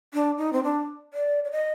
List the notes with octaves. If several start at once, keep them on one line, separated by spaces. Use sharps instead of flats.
D4
D#4
C4
D4
D5
D5
D#5